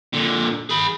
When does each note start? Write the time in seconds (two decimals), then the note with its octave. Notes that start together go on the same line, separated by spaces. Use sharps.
0.13 A#2 D3
0.69 G#4 B5